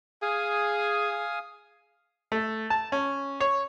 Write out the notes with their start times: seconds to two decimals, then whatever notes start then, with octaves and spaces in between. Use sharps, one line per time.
0.22 G#4 F5 G#5 D#6
2.32 A3
2.70 A5
2.92 C#4
3.40 C#5